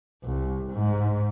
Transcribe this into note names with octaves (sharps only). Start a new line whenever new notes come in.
C2
G#2